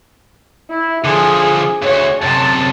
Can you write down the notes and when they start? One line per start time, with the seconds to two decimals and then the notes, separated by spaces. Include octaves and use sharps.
0.70 E4
1.04 D3 F3 G#4
1.82 D2 G2 C#5
2.21 F#2 C3 A5